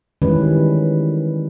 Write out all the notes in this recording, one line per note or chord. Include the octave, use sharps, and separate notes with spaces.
D#3 E3 G3 G#3 C#4 B4